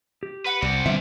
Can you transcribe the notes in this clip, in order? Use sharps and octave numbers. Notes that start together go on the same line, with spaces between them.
G4
B4 F#5
C2 C4 D5
D3 G3 B3 E5